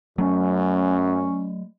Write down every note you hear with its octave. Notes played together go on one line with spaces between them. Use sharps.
F#2 F#3 A3 C#4